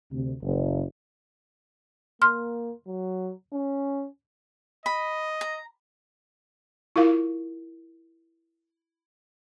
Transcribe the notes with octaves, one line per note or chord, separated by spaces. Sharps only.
D2 C3
F#1
A#3 C6 F6
F#3
C#4
D#5 B5
A#5
E4 F4 A#4 F5